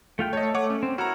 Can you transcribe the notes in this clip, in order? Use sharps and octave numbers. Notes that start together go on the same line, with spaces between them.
A3 F4 G5
A3 A4 C#5 D#5
A3 C#5 F#5 D6
C#4
C4
E4 F#4 A#4 C#5 A#5